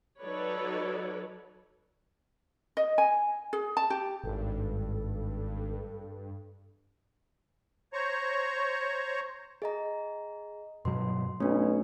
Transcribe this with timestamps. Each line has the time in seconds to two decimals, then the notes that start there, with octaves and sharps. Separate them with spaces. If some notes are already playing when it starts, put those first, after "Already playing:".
0.20 F#3 D#4 A4 B4 C#5 D5
2.77 D#5
2.98 G#5
3.53 G#4
3.77 A5
3.90 G4
4.24 G#1 G2 A4
7.93 C5 C#5 A#5 C#6
9.62 G#4 D#5 A#5
10.85 G2 B2 F#3 C6
11.40 B1 A3 C#4 D4